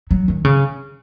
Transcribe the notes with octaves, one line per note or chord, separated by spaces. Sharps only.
F#3
D#3
C#3